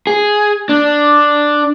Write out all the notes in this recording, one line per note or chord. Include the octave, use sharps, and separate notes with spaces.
G#4
D4